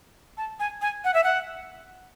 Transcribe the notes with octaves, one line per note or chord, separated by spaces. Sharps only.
A5
G#5
G#5
F#5
E5
F#5